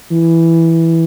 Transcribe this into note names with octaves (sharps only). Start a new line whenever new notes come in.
E3